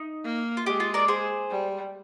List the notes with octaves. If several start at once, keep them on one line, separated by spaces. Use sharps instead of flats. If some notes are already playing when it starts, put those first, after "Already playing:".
Already playing: D#4
A#3
F4
G#3 G4
F4
A#4 D5
G#4 C5
G3